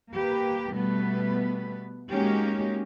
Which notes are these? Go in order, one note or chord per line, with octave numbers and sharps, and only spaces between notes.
A#3 G4 B4
B2 G3 A3 B3 B4
G#3 A#3 C#4 D#4 F#4 G4